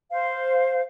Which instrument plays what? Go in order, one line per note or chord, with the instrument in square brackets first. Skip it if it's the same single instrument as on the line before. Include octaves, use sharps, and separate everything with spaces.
[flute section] C5 F5